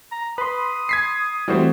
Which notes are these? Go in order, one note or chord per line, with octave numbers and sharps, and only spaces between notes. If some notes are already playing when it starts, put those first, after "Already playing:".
A#5
B4 B5 C6 D#6
G#6 B6 C7
E3 G3 A3 C4 F#4 C5